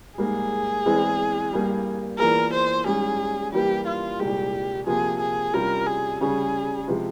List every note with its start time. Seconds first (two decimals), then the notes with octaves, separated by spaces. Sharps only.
0.18 G#2 G3 A#3 G#4
0.86 E2 E3 G#3 C4
1.53 G2 G3 A#3
2.19 E2 E3 A#3 F4 G#4 A#4
2.53 C5
2.86 G#2 G3 C#4 G#4
3.52 E3 G3 A#3 G4
3.86 F4
4.19 C2 A#2 G#3 G4
4.87 C3 F3 A#3 G#4
5.20 G#4
5.53 C3 G3 C#4 F4 A#4
5.87 G#4
6.20 C#3 G3 C#4 G#4
6.88 C3 F3 G#3